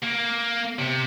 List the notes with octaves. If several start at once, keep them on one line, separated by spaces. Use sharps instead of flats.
A#3
C3